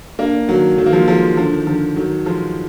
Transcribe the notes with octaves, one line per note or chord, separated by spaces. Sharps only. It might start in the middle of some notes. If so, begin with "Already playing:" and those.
A#3 D4
D#3 F#3
D#3 F#3
A#3
F3 G#3
F3 G#3
D3 F3
D#3
D3 F3
D#3 F#3
F3 G#3